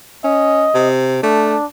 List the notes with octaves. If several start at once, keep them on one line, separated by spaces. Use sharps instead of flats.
C#4 D#5
C3
A3 D4